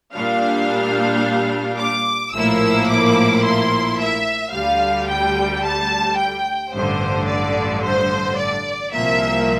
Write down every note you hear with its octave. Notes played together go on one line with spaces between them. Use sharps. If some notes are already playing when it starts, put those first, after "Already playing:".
A#2 G3 D4 F5
D6
A#1 A2 F3 A#3 E4 E6
D6
C6
E5
D2 D3 G3 F5
G5
A5
G5
A1 G2 D3 C5
D5
C5
D5
C2 A#2 F3 A#3 E5